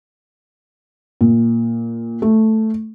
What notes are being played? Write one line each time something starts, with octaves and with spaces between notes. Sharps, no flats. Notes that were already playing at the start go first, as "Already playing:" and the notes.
A#2
A3